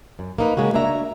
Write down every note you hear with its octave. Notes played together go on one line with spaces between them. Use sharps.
F#2
A#3 D#4 B4
C#3 G#3 A#3 F#4
A#3 D4 F#4 E5 A#5